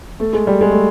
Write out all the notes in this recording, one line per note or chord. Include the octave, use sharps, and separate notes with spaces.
A3
G#3
G3
G#3
A3